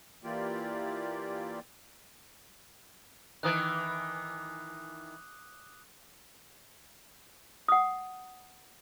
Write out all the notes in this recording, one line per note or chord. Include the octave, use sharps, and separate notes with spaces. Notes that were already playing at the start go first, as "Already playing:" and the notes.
E3 A#3 F4 G4 D5
D#3 E3 D6 D#6 F#6
F#5 D#6